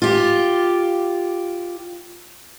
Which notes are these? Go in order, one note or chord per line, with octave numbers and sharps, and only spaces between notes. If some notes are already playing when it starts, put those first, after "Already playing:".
F4 G4